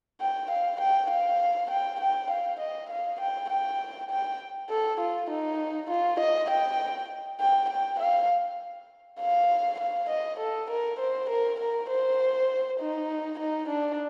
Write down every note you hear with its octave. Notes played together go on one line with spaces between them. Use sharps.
G5
F5
G5
F5
G5
G5
F5
D#5
F5
G5
G5
G5
A4
F4
D#4
F4
D#5
G5
G5
G5
F5
F5
F5
D#5
A4
A#4
C5
A#4
A#4
C5
D#4
D#4
D4